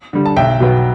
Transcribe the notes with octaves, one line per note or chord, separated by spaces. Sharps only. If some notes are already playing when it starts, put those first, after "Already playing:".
D3 G3
A5
B1 E5 G5
B2 F#3 B3